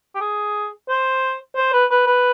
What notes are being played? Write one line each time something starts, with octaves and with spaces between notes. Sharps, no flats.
G4
G#4
C5
C5
B4
B4
B4